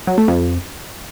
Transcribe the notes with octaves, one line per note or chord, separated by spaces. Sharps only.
F#3
A3
F2